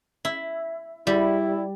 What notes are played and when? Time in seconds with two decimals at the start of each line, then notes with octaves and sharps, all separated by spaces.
0.25 E4
1.07 G3 E4